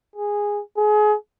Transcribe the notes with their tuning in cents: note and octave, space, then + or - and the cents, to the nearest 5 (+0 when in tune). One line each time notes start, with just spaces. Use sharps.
G#4 -10
G#4 +30